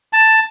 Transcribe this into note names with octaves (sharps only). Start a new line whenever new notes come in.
A5